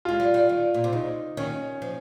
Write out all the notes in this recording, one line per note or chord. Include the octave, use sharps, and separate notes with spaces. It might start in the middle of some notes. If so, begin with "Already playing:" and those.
G#3 F4
G3
G3
D#3
A#2
C3
C#3 D#4
D#3 C#4
F3